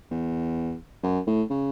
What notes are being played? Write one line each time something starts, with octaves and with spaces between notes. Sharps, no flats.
E2
F#2
A2
C#3